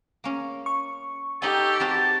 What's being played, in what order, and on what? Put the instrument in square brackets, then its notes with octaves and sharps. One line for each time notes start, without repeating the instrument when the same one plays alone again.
[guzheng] A#3 C#4
[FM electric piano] C#6
[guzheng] D#4 G#5 [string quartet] G4 [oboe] A4
[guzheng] C4 F#4 B4 [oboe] A5